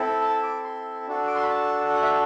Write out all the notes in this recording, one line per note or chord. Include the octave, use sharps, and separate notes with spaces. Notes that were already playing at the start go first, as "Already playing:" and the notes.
Already playing: C4 E4 A4
A5
D6
C6
D4 F#4 A4
D6
C6
B5
A5
F#5
E5